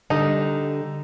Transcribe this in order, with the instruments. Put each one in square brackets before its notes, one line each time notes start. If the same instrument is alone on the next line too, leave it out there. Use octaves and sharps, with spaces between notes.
[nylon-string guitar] D3 G3 [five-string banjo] D#4